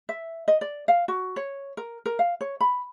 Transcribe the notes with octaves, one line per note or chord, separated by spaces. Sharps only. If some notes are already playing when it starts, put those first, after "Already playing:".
E5
D#5
D5
F5
F#4
C#5
A#4
A#4
F5
C#5
B5